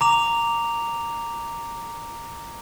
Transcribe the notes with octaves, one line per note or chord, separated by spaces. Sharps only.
A#5 D6 F7